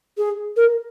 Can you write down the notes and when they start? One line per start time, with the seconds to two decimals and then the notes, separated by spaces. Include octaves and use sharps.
0.18 G#4
0.57 A#4